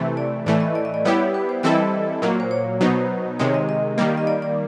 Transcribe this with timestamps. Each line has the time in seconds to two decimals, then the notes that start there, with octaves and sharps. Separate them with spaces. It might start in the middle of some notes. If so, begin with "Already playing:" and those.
Already playing: C3 E3 A3
0.17 D5
0.46 A2 E3 A3 D5
0.60 D#5
0.75 D5
0.85 D#5
0.94 D5
1.05 G3 B3 E4 G4 C#5
1.34 B4
1.49 C5
1.63 E3 G3 C4 E4 A4 D#5
2.22 A#2 F#3 A#3
2.40 C5
2.51 C#5
2.81 B2 F#3 B3 D#4 C5
3.39 C3 D#3 G#3 C#5
3.54 D#5
3.69 D#5
3.98 D#3 G3 A#3
4.17 D#5
4.27 D5
4.42 D5